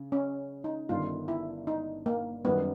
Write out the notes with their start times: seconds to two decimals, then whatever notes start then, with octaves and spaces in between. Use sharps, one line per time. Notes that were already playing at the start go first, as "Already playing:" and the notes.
Already playing: C#3
0.12 C#4
0.64 D#4
0.89 G1 G2 D#3 F4
1.28 E4
1.67 D#4
2.06 A#3
2.45 F#2 D#3 G3 B3